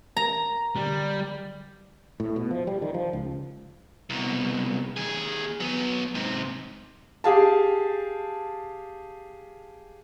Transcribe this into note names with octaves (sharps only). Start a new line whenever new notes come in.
A#4 A#5
D3 G3
A2
B2
F3
G3
D#3
F3
C#2
C2 B2
D#2 G#4
F#3 B3
G#2 C3
G4 G#4 F5 A5